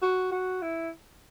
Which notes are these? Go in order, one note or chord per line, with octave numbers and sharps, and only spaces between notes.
F#4
F#4
E4